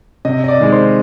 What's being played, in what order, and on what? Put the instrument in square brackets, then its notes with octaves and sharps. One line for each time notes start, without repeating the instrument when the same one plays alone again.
[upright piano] C3 D#5
D#5
D5
D#3 G#3
C5